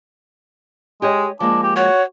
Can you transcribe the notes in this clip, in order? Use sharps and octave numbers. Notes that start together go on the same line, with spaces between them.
G#3 G4 C#5 D#5
F3 G#3 A#3 D4
G4
F#4 C#5